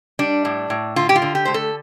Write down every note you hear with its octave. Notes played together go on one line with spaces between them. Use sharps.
G3 D4
A2
A2
D3 F4
G4
F4
D3
G4
A3 C5
A4